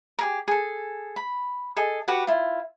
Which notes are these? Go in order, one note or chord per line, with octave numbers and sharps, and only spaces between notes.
G4 G#4 A#4
G#4 A4
B5
G#4 A4 D#5
F#4 G4 B4 F#5
E4 F4